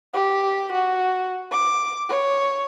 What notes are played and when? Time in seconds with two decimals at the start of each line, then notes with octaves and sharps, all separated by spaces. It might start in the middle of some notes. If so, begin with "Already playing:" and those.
0.14 G4
0.73 F#4
1.52 D6
2.09 C#5